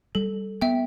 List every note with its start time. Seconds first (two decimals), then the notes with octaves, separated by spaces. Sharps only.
0.15 G3 A4
0.61 B3 E5 G5